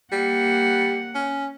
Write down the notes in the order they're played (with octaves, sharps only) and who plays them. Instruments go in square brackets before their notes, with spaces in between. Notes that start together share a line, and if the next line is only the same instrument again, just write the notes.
[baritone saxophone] G3 [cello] A#3 F#5
[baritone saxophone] C#4